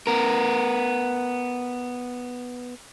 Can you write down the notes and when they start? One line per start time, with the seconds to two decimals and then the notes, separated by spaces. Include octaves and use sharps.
0.07 B3 A#4